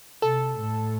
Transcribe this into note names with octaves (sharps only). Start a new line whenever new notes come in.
C3 A4
A2